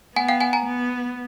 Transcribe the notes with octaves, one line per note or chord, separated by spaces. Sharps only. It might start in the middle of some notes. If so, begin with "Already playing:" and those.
B3 F#5 G#5
F5 G5
F#5 G#5
G#5 A#5
B3